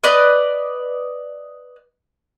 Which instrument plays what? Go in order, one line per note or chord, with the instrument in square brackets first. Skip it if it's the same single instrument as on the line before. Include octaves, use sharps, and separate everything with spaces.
[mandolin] B4 D5 D#5